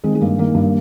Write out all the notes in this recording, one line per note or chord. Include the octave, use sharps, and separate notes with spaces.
D#3 G#3 C4
G#3
G2 A#3
D#3 A#3
G2